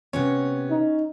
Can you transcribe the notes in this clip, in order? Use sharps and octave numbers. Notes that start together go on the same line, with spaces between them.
C3 B3 C#4 C#5
D#4